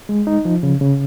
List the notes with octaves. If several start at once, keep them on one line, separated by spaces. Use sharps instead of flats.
G#3
D#4
F3
C#3
C#3